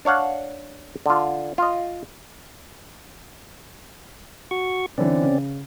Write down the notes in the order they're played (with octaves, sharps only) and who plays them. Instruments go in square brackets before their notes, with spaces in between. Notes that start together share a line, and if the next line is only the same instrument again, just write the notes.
[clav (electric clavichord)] D4 C#5 F5 F#5
D3 F4
F4 D#5
[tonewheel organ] F#4 C#6
[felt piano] D3 E3 [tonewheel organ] C4 C#4 D5
[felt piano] C#3